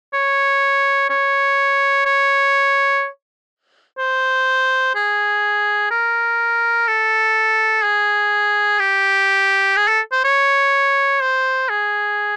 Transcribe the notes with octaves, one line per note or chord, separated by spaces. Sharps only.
C#5
C#5
C#5
C5
G#4
A#4
A4
G#4
G4
G#4
A4
C5
C#5
C5
G#4